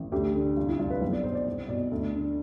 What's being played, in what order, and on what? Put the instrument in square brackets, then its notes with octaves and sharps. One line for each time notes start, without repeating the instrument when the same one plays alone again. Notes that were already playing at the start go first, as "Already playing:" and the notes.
Already playing: [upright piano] A1
D2 G4
D3
C2 F4
E4
C2 F4
B4
B1
D5
B2 C5
D5
C2
B2 D5
D2
D3